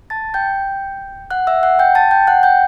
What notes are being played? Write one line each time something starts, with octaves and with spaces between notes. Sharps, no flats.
A5 A6
G5 G6
F#5 F#6
E5 E6
F#5 F#6
G5 G6
A5 A6
G5 G6
F#5 F#6
G5 G6